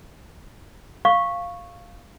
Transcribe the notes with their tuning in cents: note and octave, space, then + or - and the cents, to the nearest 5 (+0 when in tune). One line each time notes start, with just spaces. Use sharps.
F5 +0 C#6 -10